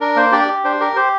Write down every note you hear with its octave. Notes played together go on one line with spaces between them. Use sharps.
D4 A#4
A#3 C5
D4 G4 D5
G4
D4 C5
G4 A#4
G4 C5